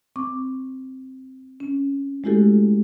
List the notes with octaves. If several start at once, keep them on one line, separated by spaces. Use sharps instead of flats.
C4 C#6 D6
C#4
G#3 A3 E4 F#4 G4 A4